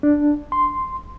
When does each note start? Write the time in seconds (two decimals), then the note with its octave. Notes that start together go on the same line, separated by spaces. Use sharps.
0.03 D4
0.52 C6